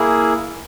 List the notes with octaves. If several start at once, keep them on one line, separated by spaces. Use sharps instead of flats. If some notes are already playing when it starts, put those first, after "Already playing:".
Already playing: A#3 E4 G#4